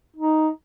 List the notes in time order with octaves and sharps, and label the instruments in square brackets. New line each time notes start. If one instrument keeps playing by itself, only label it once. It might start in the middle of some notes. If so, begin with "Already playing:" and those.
[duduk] D#4